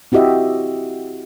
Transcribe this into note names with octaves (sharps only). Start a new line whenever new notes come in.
C4 E4 F#4 G4 D#5 E5